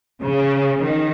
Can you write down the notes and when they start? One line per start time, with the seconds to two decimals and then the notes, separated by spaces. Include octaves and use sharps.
0.21 C#3
0.83 D#3